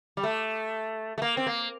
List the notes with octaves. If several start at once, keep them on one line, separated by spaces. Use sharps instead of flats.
G3
A3
A3
A#3
C4
A#3